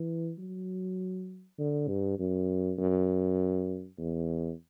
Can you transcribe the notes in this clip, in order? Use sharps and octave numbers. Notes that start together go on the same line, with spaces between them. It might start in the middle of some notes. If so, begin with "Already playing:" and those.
Already playing: E3
F#3
D3
G2
F#2
F#2
E2